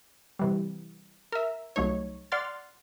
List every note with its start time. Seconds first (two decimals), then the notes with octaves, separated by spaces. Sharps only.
0.39 C3 E3 G3
1.32 A#4 E5
1.76 C2 F#3 A3 D#4 C#5
2.32 D5 F#5 C6 F6 A6